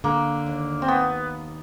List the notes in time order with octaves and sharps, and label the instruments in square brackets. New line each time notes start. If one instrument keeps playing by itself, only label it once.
[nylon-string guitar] D3 [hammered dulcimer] A#3
[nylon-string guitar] D#2
[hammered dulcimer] C4
[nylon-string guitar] D#2 [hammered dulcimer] B3